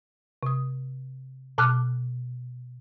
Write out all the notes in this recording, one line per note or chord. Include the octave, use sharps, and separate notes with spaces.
C3 D#6
B2 A5 D6 F6 F#6